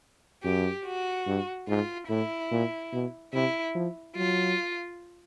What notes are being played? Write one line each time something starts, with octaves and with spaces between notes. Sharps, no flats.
F#2 G4
F#4
G2
G#2 F4
A2 E4
A#2
B2
C3 E4
F3
F#3 F4